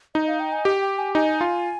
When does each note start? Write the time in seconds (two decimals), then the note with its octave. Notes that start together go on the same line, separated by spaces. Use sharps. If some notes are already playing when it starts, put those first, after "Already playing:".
0.15 D#4 D#5
0.27 F5
0.40 G5
0.52 G#5
0.65 G4 G5
0.81 G5
0.98 G#5
1.15 D#4 G#5
1.41 F4